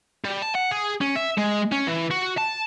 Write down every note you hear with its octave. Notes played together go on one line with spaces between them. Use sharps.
G3
A5
F#5
G#4
C#4
E5
G#3
C#4
E3
F#4
A5